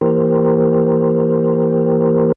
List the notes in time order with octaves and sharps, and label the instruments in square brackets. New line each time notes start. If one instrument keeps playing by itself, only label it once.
[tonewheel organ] E3 A#3 G4 A#4 C5